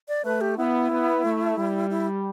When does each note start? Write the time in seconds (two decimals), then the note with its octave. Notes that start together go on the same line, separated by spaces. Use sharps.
0.08 D5
0.24 A3 B4
0.41 G4
0.57 B3 E4
0.91 B3
1.24 A3
1.58 G3
1.90 E4